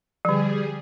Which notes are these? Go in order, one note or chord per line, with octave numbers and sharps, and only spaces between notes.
D3 F3 G3 G#4